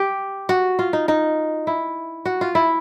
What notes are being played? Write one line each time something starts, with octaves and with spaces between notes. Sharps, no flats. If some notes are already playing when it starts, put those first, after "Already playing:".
Already playing: G4
F#4
F4
D#4
D#4
E4
F#4
F4
E4